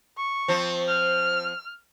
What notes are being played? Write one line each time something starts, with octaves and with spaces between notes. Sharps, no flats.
C#6
F3 C4
F6